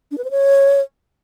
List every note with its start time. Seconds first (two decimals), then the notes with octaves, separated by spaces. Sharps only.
0.11 D4
0.18 B4
0.24 C5
0.31 C#5